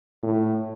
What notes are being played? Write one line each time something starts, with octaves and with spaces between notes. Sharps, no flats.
A2